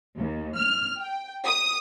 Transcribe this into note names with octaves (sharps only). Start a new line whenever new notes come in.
D#2
F6
G5
D#6